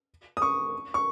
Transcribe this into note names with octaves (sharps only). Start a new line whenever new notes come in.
D#6
C#6
C#6